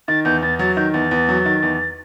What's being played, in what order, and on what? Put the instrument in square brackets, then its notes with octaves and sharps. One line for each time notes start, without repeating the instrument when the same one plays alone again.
[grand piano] D#3 [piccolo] A6
[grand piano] E2 [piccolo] G6
[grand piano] E2 [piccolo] A6
[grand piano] F#3 [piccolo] A6
[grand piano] D#3 [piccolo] G6
[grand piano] E2 [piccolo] A6
[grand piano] E2
F#3
D#3
E2